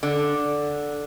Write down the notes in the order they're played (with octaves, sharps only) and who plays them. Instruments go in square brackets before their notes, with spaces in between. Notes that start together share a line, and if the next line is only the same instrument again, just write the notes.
[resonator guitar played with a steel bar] D3